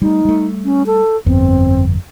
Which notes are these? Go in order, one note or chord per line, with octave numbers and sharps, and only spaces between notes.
G3 A3 D#4
G3 A3
C#4
A4
G1 F2 B3 C4